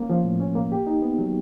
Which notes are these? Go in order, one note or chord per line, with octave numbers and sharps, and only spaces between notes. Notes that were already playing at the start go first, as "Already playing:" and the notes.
Already playing: A#3 C#4
F3
A2
C#4
A#3
G4
D#4
B3
F#3